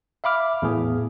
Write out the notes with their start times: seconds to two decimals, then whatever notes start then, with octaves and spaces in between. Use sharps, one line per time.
0.24 E5 F5 B5 D6 F6
0.62 E2 A2 G#4